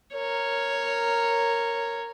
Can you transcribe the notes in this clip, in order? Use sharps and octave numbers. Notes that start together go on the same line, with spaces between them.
A#4 C#5